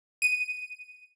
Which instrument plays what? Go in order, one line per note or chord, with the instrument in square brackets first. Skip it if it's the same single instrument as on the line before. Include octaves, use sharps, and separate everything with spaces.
[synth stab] D#7